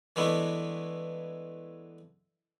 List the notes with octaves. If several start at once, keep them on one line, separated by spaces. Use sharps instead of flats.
E3 G#3 A3 B3 D4 E4